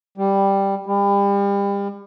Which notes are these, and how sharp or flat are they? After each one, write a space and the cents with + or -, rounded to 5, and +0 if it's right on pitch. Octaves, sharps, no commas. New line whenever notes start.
G3 +5
G3 +35